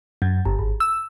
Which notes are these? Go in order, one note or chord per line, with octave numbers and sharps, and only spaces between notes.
F#2
G1
G#1
E6